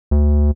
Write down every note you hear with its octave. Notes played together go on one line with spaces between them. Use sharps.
D2